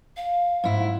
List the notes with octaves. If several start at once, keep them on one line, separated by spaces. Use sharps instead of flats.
F5
G#2 E4